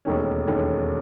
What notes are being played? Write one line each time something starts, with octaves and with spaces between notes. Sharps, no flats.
E1 D#2 D#3 A3 C#4
E1 D#2 D#3 A3 C#4